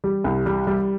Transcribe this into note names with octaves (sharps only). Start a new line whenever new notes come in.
G3
C2
G3
G3